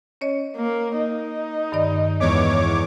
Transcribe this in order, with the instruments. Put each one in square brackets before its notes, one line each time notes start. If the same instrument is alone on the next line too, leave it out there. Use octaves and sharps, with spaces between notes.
[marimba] C#4 C#5 D#5
[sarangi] A#3
D#4
[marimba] G2 D#3 D5
[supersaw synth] E2 C#5 D6 [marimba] G2 G#3